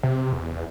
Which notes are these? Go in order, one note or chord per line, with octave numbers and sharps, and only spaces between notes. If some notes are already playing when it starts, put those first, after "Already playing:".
C3
E2